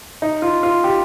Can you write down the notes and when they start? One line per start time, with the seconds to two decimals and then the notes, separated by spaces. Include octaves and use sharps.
0.22 D#4
0.42 F4
0.63 F4
0.84 G4